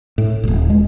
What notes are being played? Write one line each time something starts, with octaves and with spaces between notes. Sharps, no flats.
A2
D#1 G#1
G#3